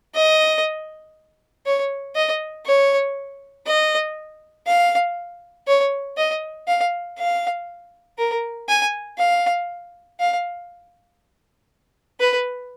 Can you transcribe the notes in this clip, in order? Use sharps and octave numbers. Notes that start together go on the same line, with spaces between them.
D#5
C#5
D#5
C#5
D#5
F5
C#5
D#5
F5
F5
A#4
G#5
F5
F5
B4